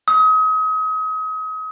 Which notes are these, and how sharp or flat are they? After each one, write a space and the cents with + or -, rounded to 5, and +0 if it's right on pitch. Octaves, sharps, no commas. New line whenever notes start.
D#6 +35